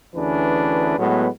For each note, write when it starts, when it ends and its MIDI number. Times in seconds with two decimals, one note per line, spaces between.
0.15 0.96 38
0.15 0.96 52
0.15 0.96 61
0.15 0.96 62
0.15 0.96 68
0.15 0.96 71
0.99 1.27 45
0.99 1.27 54
0.99 1.27 56
0.99 1.27 59